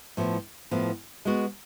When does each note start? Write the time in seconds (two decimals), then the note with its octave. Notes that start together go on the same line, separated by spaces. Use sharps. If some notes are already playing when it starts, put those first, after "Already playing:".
0.17 A2 F3 B3
0.71 A2 F3 B3
1.25 G#3 B3 F#4